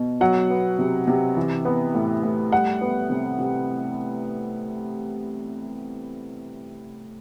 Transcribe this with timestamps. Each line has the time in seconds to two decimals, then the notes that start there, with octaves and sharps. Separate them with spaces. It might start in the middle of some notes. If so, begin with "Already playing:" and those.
Already playing: B2
0.21 F#3 F#5
0.50 B3
0.79 C3
1.08 C3
1.37 E3
1.65 B3
1.95 A2
2.23 A2
2.52 G3 F#5
2.81 B3
3.10 C3
3.39 C3